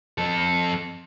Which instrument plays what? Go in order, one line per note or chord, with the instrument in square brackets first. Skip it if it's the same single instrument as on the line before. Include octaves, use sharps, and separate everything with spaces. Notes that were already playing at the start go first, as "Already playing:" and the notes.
[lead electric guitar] F2 A4